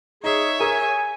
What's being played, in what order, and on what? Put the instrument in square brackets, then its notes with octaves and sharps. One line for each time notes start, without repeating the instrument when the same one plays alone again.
[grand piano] D#4 [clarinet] G#4 [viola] C#5 E5
[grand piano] G#4 A#4 [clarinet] G#5